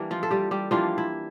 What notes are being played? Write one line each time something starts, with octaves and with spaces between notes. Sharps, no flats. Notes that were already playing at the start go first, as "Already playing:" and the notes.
Already playing: E3 G3 A#3 D4
F3 F4
A4
G3 G4
G3 G4
E3 F3 G3 A#3 D4 F4
E4